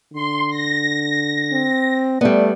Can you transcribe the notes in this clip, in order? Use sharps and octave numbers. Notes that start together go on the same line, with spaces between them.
D3 C6
A#6
C4
G3 A3 B3 D5